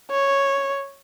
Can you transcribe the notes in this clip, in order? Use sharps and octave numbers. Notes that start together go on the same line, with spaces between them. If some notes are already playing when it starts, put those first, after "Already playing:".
C#5